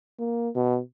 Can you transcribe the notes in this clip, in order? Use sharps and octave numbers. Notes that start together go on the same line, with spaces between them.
A#3
B2